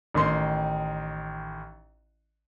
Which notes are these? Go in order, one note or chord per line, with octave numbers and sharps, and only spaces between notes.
A1 D#3 C6